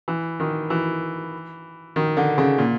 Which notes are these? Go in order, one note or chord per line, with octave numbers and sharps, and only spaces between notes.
E3
D#3
E3
D#3
D3
C#3
A#2